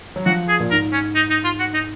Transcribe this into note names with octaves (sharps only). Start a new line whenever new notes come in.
F#3
F3 F#4
G#4
A#2
G#2 A#4
C#4
D#4
D#4
F4
F#4
D#4